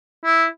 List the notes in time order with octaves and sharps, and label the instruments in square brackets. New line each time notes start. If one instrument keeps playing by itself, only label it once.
[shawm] E4